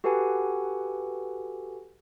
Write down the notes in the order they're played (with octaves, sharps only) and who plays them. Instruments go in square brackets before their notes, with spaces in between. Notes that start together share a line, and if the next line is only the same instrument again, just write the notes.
[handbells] F#4 G4 A4 B4 F#5 G#5